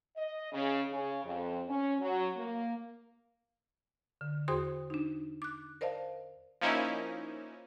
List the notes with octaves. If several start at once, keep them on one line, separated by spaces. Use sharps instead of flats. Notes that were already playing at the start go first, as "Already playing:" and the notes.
D#5
C#3
C#3
F2
C#4
F#3
A#3
D3
E2 F#4 G#4 C5 C6 D#6
D4 D#4
D6 F#6
A#4 C5 D5 D#5 F5 A5
F3 A#3 C#4 D#4 E4